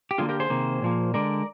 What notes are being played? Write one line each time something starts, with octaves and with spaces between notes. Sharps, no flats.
G4
D3 G3 A#3 F4 G#4
G4 A#4
G#4 C5
C3 D#3 A#3
A#2 F3 A#3
D3 G#3 A#4 D5